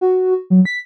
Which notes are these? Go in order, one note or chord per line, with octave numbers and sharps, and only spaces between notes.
F#4
F#3
B6